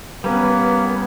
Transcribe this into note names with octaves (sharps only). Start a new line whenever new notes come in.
G3 A#3 B3 C#4 B4